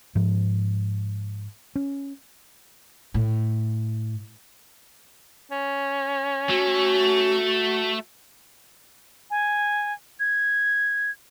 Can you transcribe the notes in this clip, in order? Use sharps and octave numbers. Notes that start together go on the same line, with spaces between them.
G#2 F3
C#4
A2
C#4
A3 F#4
G#5
G#6